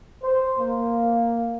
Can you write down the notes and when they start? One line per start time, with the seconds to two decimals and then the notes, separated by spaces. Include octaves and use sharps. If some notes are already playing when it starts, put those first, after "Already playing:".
0.23 C5
0.59 A#3